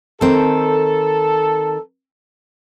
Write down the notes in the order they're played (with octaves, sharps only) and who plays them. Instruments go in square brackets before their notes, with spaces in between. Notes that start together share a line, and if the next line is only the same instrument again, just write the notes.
[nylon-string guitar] D#3 C4 [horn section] A4